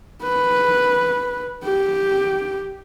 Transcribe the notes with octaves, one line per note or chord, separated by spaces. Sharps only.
B4
G4